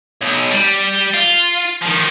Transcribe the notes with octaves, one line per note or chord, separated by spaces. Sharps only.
B1
G3
F4
D#3 F3